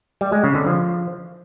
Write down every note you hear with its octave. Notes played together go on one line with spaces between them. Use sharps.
G3
G#3
C#3
D3
F3